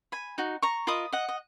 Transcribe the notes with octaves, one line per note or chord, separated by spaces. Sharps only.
G#5 B5
D#4 F#4
A#5 C#6
F4 A#4 D#5 B5 D#6
D#5 F#5
D#5